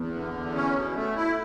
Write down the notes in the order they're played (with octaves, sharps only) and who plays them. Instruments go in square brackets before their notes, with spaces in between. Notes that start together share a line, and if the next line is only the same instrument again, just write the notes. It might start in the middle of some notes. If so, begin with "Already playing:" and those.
Already playing: [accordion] E2 [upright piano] B3
[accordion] D3
E2
C#4
B2
A3
E4